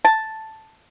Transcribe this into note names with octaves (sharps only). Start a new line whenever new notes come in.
A5